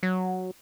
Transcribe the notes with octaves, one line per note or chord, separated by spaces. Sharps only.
F#3